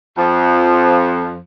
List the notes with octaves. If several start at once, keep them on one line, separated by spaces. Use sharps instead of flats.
F2 F3